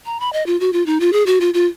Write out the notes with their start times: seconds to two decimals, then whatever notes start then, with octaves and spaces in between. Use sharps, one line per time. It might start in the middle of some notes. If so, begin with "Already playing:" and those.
0.06 A#5
0.20 B5
0.33 D#5
0.46 F4
0.60 F#4
0.73 F4
0.86 D#4
1.00 F4
1.13 G#4
1.26 F#4
1.41 F4
1.54 F4